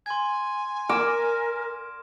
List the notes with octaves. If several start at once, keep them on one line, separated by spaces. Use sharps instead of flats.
G#5 C6 G#6
A#4 D6 F6 A#6 E7